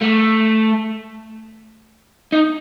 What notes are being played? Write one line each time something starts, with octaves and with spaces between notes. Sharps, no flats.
A3
D#4